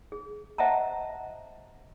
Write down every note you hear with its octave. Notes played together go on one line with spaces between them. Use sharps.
G#4
C5 D#5 E5 F#5 A5 A#5